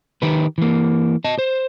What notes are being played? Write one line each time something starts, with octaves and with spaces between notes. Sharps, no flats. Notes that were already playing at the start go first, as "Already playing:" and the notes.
D#3 G4 B4
E3 A#3
D#5 A5
C5